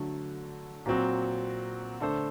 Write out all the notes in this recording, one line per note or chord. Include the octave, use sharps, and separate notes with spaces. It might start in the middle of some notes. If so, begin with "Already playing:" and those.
Already playing: D3 F#3 A3
A#2 F#3 C4 F#4
D3 A3 D4 A4 C5